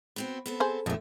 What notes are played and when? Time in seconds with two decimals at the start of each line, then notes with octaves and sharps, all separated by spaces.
0.16 B3 C4 F#4
0.46 B3 C4 A4
0.60 G#4 C5
0.86 A#1 F2 D3 A3